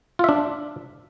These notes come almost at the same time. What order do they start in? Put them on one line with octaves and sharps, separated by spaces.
F4 E5 D4